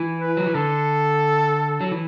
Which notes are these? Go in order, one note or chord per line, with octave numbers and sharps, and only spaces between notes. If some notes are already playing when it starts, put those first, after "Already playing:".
Already playing: E3
B4
F#3
E3
D3 A4
F#3
E3